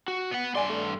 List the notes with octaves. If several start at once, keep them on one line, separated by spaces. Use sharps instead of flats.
F#4
B3 F#5
G2 D5 G#5 C6
A3